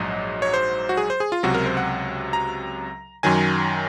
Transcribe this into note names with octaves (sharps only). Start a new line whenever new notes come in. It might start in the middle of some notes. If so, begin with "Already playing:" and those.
Already playing: A#1 G#2 F#3 D#5
C#5
C5
F#4
G#4
C5
G#4
F4
C#2 C3 F#3 F#4
A#4
C5
F#5
A#5
F#2 D#3 F#3 G#5